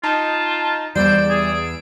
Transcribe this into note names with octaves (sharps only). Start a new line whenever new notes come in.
D#4 F4 A5
E2 G3 C5 D5 E6 D7
G#4